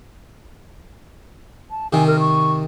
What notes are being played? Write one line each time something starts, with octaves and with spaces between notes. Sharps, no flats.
A5
C3 D#3 G#5
A#4
C#6